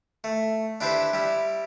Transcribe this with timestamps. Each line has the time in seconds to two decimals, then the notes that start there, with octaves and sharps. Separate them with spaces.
0.24 A3
0.81 D4 E4 G4 B4 C5
1.13 G3 E4